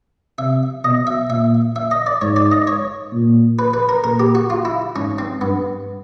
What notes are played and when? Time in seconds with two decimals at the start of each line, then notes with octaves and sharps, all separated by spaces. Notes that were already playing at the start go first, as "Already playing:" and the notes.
0.38 C3 E5
0.84 B2 D#5
1.07 E5
1.30 A#2 E5
1.76 E5
1.91 D#5
2.06 D5
2.21 G#2 C#5
2.36 D5
2.52 D#5
2.67 C#5
3.13 A#2
3.59 B4
3.74 B4
3.89 A#4
4.04 A#2 A#4
4.20 G4
4.35 F#4
4.50 F4
4.65 E4
4.96 G#2 C#4
5.19 C4
5.41 G2 B3